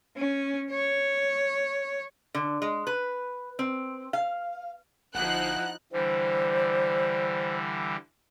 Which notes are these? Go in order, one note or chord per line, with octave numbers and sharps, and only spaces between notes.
C#4
C#5
D3
G#3
B4
C4
F5
G1 F3 D#4 E4 F#5 F#6
D3 E3 G3 C5